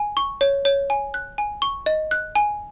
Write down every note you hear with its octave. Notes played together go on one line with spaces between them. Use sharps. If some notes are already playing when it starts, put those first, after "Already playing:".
Already playing: G#5
C#6
C#5
C#5
G#5
F#6
G#5
C#6
D#5
F#6
G#5